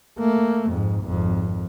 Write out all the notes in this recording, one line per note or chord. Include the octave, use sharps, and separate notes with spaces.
A3 A#3
F2 G#2
G#1 F2